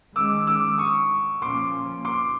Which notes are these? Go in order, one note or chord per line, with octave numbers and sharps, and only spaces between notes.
D#3 G#3 C#4 D6 E6
D6 E6
C#6 D#6
A#2 F3 A#3 C#4 C6 D6
C6 D6